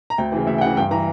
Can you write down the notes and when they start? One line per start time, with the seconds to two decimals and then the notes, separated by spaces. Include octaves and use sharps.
0.10 A#5
0.18 D2 G5
0.32 C#3 E3
0.47 D2 E5
0.58 G5
0.61 C#3 E3 F#5
0.77 G2 G5
0.91 E3 A#5